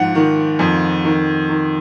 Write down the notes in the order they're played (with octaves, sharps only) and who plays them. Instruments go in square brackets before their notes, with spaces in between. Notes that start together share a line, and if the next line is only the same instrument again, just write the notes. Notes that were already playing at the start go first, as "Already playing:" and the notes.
Already playing: [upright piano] G#2 F3 F#5
D#3
F2
D#3
D#3